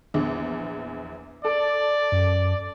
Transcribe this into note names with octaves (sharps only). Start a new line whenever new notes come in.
A#1 E2
A4 D5
F#2